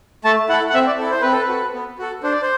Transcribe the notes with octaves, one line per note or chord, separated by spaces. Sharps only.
A3 A5
E4 A4 F#5
F#5
C4 E5
D5
E4 A4
C5
C4 B4
A4
B4
F#4 A4
B3
F#4 A4
D4 C5
D5
C5